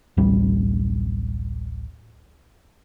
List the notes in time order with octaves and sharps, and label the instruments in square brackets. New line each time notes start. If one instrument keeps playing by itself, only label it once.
[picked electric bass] D1 A1 G3